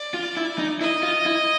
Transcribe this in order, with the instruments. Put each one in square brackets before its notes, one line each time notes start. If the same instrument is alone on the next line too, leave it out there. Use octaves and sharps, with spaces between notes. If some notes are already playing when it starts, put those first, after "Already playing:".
Already playing: [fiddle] D5
[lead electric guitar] F4
E4
D#4
[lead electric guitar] E4 [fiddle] D#5
[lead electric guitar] F4
E4